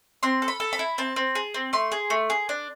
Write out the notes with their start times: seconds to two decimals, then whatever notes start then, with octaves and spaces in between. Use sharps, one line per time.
0.23 C4 C6
0.42 A4
0.48 B5
0.60 A4
0.73 B5
0.79 E4
0.98 C4 A5
1.16 C4
1.35 G#4
1.54 C4
1.73 A3 C6
1.92 G#4
2.10 A3
2.30 G#4
2.49 D4